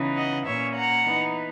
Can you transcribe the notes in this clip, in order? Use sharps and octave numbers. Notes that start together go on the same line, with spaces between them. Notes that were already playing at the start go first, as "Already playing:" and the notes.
Already playing: C#3 E3 B3 D#4
D#5 F#5
A#2 A#3 C#4 C#5 E5
F#5 A#5
E3 B3 D#4